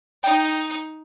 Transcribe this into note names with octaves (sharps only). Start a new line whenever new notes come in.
D#4 G5